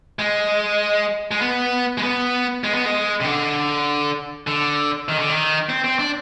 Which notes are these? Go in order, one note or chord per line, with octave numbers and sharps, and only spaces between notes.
G#3
G#3
B3
G#3
B3
G#3
B3
G#3
C3
D3
D3
D#3
D3
D#3
C4
C4
D4